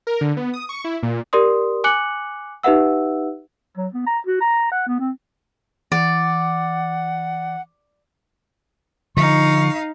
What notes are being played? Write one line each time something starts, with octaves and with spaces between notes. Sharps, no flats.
A#4
D3
B3
D#6
C#6
E4
A#2
G4 A#4 D5 C6 D#6
G#5 D6 F#6 C#7 F#7
D#4 G4 B4 E5 F#5 E6
F#3
B3
A#5
F#4
A#5
F#5
B3
C4
E3 D5 F#5
D3 F3 D#4 F5 C#6